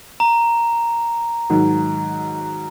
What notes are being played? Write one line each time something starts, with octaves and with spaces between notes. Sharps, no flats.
A#5
G#2 D#3 F#3